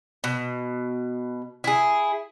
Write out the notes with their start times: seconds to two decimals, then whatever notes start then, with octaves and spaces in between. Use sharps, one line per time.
0.24 B2
1.64 E4 G#4